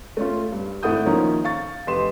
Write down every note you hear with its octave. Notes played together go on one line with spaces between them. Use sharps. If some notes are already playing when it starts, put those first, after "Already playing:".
A3 C#4 F4
G2
G#1 A3 E4 F#5 D#6 G6
D#3 F3 A#3 C#4 D#4
F5 C#6 A6
F1 G4 B4 D#5 C6 E7